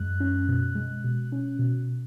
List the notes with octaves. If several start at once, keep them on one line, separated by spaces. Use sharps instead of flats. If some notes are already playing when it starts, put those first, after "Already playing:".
Already playing: F#2 G#3 F#6
C#4
B2
G#3
B2
C#4
B2